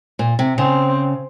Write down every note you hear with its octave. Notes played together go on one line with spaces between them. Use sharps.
A#2
C3
C#3 C4